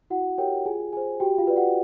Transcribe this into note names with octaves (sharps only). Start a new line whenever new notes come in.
E4 F#4 F#5
G4 A#4 C#5 G5
F4 G#4 G#5
G#4 C5 G#5
F#4 G4 G5
F4 F5
B4 D5
F#4 F#5